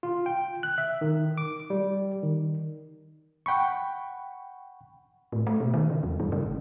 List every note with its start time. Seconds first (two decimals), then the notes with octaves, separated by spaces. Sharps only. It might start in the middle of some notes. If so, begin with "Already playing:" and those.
0.03 F4
0.26 G5
0.63 F#6
0.78 E5
1.01 D#3
1.38 D6
1.70 G3
2.23 D#3
3.46 F#5 G5 B5 C#6
5.32 A2
5.47 A3
5.60 B2
5.74 D#3
5.90 C#3
6.03 E2
6.20 G2
6.32 C#3
6.45 G1